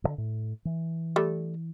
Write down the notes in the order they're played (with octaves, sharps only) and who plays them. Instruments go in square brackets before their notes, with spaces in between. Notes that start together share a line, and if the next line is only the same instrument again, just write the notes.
[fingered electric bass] G2 D3
A2
E3
[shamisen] G3 A3